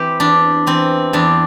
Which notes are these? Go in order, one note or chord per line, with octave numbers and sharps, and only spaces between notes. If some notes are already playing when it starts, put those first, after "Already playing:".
Already playing: E3 C4 G4
E2 D4
E3 C4
E2 D4